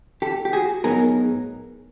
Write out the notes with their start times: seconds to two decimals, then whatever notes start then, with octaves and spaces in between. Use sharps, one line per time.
0.22 G4 A4
0.45 G4
0.53 F#4 G#4
0.84 A2 F#3 B3 D#4 G#4 A#4